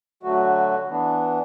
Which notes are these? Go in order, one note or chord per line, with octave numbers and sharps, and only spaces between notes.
D3 F#3 A3 F#4
E3 B3 D4